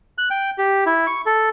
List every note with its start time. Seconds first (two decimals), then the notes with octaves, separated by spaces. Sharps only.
0.18 F#6
0.30 G5
0.58 G4
0.86 E4
1.07 C#6
1.26 A4